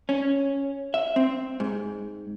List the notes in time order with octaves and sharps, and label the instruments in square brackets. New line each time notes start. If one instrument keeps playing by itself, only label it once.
[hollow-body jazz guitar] C#4
E5
C4
G#2